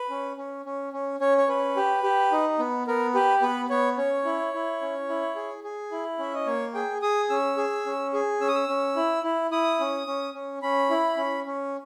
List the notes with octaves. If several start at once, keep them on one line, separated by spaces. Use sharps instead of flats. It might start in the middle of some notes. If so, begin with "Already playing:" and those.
Already playing: B4
C#4
C#4
C#4
C#4
C#4 C#5
C#5
C#4 B4
G4
G4
D#4
B3
B3 A#4
G4 B4
B3 B4
B3 C#5
C#4 C#5
E4
E4
C#4
E4
G#4
G#4
E4
C#4 E5
D#5
A#3 C#5
G#4 G5
G#4 D#6
C#4 E6
G#4
C#4
G#4
C#4 E6
D#6
E6
C#4
E4
E4
E4 D#6
C#4
C#4
C#4
C#4 B5
E4
C#4
C#4